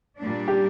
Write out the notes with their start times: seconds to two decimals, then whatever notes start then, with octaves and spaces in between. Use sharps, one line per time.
0.19 A#2 G3 D4
0.48 G4